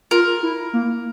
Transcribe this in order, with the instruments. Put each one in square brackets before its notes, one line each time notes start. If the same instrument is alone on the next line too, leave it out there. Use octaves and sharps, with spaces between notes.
[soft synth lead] F4 [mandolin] A#4
[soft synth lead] E4
A#3